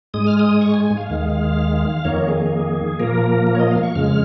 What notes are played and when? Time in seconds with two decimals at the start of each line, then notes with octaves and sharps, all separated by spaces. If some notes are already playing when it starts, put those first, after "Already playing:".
0.14 G#2 G#3 D#6
0.27 F6
0.39 D#6
0.61 C#6
0.74 G#5
0.85 G#5
0.97 F5
1.10 D#2 D#3 G#3
2.05 F2 D#3 A#3 C#5
2.28 G#4
2.99 A#2 F3 A#3 A#4
3.47 A#4
3.55 C#5
3.59 D#5
3.71 F5
3.83 C#6
3.95 F2 C#3 G#3 F6